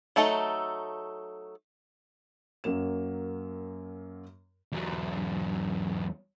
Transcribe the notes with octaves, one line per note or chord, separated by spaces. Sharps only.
F#3 A3 D#4 A4
F#2 F#3 A#3 E7
E2 F#3